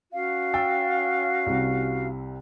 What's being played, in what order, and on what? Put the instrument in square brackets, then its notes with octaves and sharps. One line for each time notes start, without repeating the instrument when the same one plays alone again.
[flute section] C#4 F#4 F5
[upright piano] G5 E6 A6
C2 C3